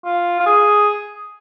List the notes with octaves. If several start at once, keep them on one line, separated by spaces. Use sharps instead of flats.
F4
F4
G#4